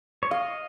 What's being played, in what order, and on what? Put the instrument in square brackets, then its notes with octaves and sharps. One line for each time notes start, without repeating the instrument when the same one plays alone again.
[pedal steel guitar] C#5
[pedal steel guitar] D#5 [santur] F5